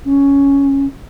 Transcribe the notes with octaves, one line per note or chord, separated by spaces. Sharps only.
C#4